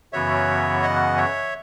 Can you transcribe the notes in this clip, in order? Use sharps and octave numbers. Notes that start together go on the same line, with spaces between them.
F#2 C#3 E3 B3 F#4 C#5 E5
D#5 F#5
C#5 E5